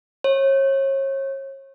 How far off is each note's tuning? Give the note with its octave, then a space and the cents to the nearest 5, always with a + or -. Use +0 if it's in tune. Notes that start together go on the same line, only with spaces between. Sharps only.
C#5 -35